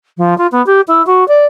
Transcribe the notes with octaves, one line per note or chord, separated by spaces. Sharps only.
F3
F4
B3
G4
E4
F#4
D5